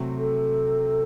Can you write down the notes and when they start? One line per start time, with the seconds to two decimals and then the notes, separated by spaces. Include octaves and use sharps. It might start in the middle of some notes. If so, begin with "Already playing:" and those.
Already playing: C3 F#3 A3 C4
0.19 A4